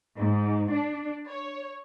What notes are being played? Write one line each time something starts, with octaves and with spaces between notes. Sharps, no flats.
G#2
D4
C#5